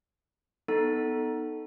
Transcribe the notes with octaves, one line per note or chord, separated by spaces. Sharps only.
B3 D#4 A4